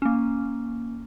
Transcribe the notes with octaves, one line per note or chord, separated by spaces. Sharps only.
A#3 C#4